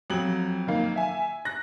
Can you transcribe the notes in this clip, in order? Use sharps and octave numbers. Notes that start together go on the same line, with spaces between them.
F2 F#3 F#7
D#3 A#3
E5 G#5
F#6 A#6